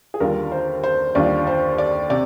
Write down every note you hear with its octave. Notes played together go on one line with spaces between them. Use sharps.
G#4
D#2 D3 G3 D4 F4 A#4
C5
C5
D#2 D3 G3 D4 F4 D5
C5
D5
C3 D5